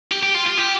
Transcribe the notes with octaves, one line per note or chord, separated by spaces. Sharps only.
G4
G4
F4
F4
G4